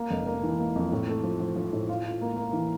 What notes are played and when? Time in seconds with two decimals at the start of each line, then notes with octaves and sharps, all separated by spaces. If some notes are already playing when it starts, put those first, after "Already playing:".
Already playing: A#3
0.10 F1
0.27 A#3
0.43 E3
0.59 A#3
0.76 F2
0.92 A2
1.08 A3
1.23 F3
1.40 F3
1.56 F3
1.73 A2
1.89 F4
2.05 F4
2.21 A#3
2.37 A#3
2.53 E3